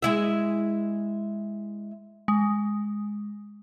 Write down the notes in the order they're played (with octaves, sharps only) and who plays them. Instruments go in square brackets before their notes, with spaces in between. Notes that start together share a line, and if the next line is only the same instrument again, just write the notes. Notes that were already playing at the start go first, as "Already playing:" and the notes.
[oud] G#3 E4 E5
[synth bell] G#3